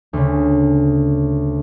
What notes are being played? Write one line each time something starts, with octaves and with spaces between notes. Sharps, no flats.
D2 C#3